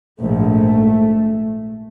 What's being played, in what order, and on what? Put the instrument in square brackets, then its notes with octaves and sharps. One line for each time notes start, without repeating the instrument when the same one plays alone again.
[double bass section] A#1 G#2 A3